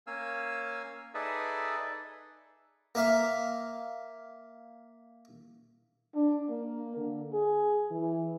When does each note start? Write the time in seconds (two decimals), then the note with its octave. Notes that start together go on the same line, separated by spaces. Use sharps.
0.07 A#3 C#4 F5 G#5 E6
1.14 D#4 G#4 A4 B4 D5 E5
2.95 A#3 E5 F5
6.15 D4
6.49 A#3
6.96 D3
7.33 G#4
7.91 E3